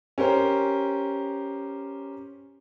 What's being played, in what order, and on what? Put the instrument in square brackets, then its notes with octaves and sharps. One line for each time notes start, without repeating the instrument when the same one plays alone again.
[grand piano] C#4 G4 A#4 C5